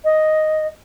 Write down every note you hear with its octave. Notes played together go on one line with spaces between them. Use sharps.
D#5